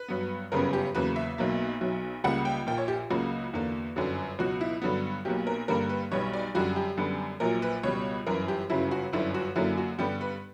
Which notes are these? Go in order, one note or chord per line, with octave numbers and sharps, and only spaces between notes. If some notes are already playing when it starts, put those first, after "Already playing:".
Already playing: B4
G2 F#3 B3
G1 F#2 C#3 G3 B3 A#4
G4
E2 C#3 F#3 A#3 B4
E5
B1 B2 F#3 A#3
B1 B2 F#3
C#2 C#3 G3 A#3 F#5
G5
A#1 A#2 A#3 G5
C#5
G4
C#2 C#3 F#3 A#3 F#4
E2 D3 A#3
G1 F#2 D3 F#3
C#2 B2 F#3 F#4
E4
G2 D3 F#3 B3
B1 B2 F#3 A#3 G4
A#4
G2 D3 G3 A#3 A#4
B4
B1 B2 G3 B3 C#5
D5
F#2 D3 G3 F#4
G4
F#2 D3 G3 B3
A#1 A#2 F#3 A#4
B4
C#2 B2 G3 C#5
G1 F#2 E3 A#4
G4
G1 F#2 C#3 F#3 E4
F#4
G1 F#2 D3 E4
F#4
F#2 D3 F#3 A#3 E4
F#4
G2 D3 G3 B3 G4
B4